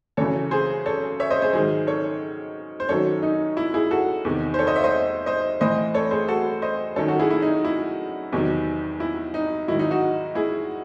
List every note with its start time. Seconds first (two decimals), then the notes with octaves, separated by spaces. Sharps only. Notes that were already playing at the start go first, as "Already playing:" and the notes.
0.17 F#2 C#3 E3 A4 C#5
0.51 G#4 C5
0.86 A4 C#5
1.20 C#5 E5
1.30 C5 D#5
1.42 G#4 C5
1.53 G#2 D#3 F#3 G#4 C5
1.87 A4 C#5
2.80 C5
2.89 F#2 D#3 F#3 A4 C#5
3.23 D#4
3.57 E4
3.74 E4 G#4
3.91 F#4 A4
4.25 E2 C3 D#3
4.54 C5
4.59 A4 C#5
4.67 C5 D#5
4.76 C#5 E5
4.84 C5 D#5
5.26 C5 D#5
5.61 A2 E3 C5 D#5
5.94 A4 C#5
6.11 G#4 C5
6.28 F#4 A4
6.62 C5 D#5
6.96 F#2 D#3 F#3 A4 C#5
7.08 F#4 A4
7.19 E4 G#4
7.30 E4
7.42 D#4
7.65 E4
8.32 E2 C3 D#3 F#3
9.00 E4
9.34 D#4
9.68 G#2 D#3 F#3 E4
9.79 D#4
9.91 D#4 F#4
10.35 E4 G#4